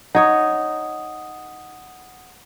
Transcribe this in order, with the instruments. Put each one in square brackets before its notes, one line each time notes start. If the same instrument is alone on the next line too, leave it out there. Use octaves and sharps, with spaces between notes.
[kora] D#4 C#5 [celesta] F#5 D#6